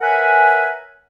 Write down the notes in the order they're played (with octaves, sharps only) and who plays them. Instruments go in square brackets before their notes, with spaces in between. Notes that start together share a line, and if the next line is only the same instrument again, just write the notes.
[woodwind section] A#4 B4 C#5 E5 F#5 G#5